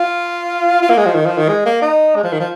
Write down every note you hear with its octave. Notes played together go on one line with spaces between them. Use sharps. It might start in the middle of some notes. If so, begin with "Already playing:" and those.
Already playing: F4
F4
A#3
G#3
F3
D#3
F3
D#3
G#3
A#3
D#4
G#3
F3
D#3
F3